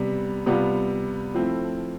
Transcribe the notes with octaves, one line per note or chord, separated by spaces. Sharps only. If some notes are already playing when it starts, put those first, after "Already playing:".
Already playing: C3 G3 B3
C3 G3 B3 F4
F3 A3 C4 E4